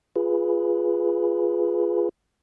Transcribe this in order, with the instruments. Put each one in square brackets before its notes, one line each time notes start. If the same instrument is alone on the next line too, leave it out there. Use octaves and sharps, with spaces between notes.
[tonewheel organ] F4 G#4 B4